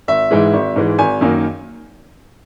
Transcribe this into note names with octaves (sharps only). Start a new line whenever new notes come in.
G#1 E5
G#2 E3 G#3
G#1
G#2 E3 G#3
G#1 G#5
F#2 D#3 A#3 D#4